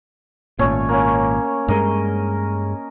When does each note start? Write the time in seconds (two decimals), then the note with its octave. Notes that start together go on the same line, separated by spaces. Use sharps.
0.59 G#1 A#2 A3 C#4 C#5
0.89 A#3 C#4
1.68 G2 G#3 A#4 D#5